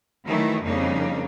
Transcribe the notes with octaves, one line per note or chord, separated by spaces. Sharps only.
D#3 E3 F#3 A3 D#4 E4
F2 C#3 G3 A#3 D4 D#4